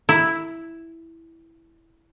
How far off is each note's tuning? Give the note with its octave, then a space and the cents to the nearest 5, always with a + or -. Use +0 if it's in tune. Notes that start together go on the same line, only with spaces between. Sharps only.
E4 +0